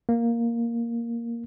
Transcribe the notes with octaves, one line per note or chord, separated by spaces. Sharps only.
A#3